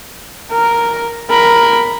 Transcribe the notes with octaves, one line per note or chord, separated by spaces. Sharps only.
A#4
A#4 B5